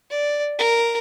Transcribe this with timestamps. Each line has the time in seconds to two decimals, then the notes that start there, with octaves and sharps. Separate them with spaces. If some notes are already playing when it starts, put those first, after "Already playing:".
0.11 D5
0.59 A#4